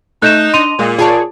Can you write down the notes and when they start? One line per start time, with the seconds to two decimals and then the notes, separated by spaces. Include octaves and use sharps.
0.22 A3 D#4 F#6 G6 E7
0.54 D4 D#5 C6 D#7 F7
0.79 A#2 G#3
0.99 F4 G#4 C#5 D5 A5